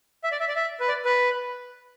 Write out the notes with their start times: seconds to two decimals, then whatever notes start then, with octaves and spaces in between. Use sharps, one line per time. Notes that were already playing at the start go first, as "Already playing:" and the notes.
0.24 E5
0.32 D5
0.40 E5
0.48 D5
0.56 E5
0.80 B4
0.88 D5
1.05 B4